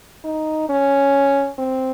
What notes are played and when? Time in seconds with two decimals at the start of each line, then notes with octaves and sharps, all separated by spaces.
0.24 D#4
0.69 C#4
1.58 C4